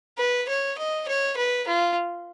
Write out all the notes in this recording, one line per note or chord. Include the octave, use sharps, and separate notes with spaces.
B4
C#5
D#5
C#5
B4
F4